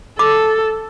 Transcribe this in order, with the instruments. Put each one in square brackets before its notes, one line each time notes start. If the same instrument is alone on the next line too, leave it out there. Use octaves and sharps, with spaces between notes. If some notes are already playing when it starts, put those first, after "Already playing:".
[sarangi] A4 [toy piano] D6